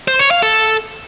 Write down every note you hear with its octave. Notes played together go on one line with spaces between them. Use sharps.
C5
C#5
F5
A4